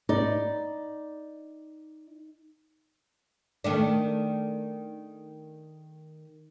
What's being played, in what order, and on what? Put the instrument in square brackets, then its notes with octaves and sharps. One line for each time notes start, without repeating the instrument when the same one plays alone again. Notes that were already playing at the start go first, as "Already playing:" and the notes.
[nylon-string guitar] D#4 D5
[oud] D#3 A3 D4